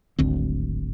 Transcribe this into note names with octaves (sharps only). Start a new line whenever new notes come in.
D1 G#1 D2 C4